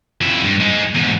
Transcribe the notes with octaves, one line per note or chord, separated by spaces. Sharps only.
F2 E4
G2
G#3 D#4
E2 G#2